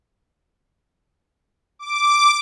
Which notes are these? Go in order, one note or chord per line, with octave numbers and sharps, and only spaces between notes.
D6